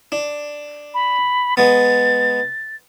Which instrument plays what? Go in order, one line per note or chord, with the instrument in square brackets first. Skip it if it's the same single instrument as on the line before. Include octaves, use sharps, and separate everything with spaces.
[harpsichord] D4
[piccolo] B5
[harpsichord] G#3 B3 [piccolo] A6